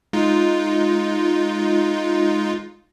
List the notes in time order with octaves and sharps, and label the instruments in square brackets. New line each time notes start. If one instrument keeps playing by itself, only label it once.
[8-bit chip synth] G#3 D#4 F4